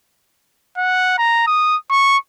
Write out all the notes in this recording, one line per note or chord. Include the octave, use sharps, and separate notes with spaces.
F#5
A#5
D#6
C#6